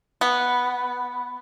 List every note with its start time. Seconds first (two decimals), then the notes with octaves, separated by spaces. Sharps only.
0.21 B3